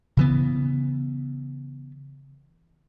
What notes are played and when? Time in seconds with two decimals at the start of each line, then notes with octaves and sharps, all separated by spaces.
0.17 C#3 E3 B3